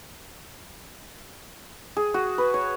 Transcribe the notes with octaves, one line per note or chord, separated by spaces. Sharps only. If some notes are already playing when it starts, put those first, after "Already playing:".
G#4
F#4
B4
C#5